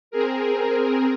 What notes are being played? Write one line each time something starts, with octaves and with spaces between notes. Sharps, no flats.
C4 G#4 A#4